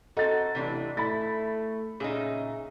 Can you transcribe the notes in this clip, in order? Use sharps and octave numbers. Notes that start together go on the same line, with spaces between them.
C4 D#4 F#4 A4 A6
A1 C3 E3 D4
A3 E4 B5 A6
A#2 C#3 D#4 G#4 E5